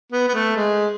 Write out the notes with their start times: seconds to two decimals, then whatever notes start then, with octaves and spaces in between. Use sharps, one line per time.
0.13 B3
0.28 B3
0.34 A3
0.56 G#3